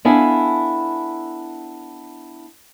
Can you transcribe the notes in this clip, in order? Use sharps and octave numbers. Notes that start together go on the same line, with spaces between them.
B3 D4 E4 A4 F5 G#5